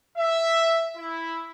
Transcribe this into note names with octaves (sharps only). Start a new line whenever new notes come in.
E5
E4